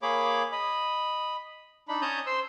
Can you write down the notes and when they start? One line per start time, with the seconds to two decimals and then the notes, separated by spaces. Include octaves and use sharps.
0.02 A#3 G#4 C#5 B5 D6
0.52 D#5 B5
1.88 D4 D#4 B5
2.01 C#4 C#5 A5 A#5 D#6 G6
2.26 C5 C6 E6